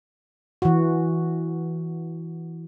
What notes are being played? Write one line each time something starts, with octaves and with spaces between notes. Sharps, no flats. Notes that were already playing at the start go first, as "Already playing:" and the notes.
E3 F#4